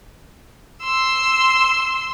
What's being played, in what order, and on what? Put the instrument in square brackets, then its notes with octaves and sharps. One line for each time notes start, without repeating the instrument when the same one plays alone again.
[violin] C6 E6